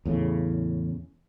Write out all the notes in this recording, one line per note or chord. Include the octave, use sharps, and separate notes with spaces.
E2 A2 C#3